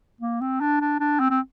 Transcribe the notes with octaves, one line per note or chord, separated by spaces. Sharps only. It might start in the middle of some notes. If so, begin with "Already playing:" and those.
A#3
C4
D4
D4
D4
C4
C4